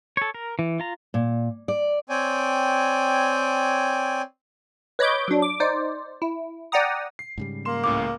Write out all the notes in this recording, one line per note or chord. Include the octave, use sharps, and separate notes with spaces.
A4 C#5
A#4
E3
F4 A#5
A#2
D5
C4 C#5 D5 G5 G#5
B4 C#5 D#5 B5 D6 G6
F#3 D4
D6
D#4 C5 D5
E4
D5 F#5 G5 A#5 D#6
C7
G#2 C#3 G3
A#3 C6 E7
C#2 A2 F5 D6